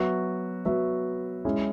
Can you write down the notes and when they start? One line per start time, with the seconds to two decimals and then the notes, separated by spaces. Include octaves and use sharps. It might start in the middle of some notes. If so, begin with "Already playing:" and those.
Already playing: F#3 B3 F#4 E5
0.65 F#3 B3 F#4 E5
1.45 G#3 C#4 E4 G#4